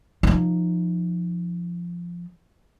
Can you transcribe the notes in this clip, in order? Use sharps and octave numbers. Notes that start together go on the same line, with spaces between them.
F3 D#4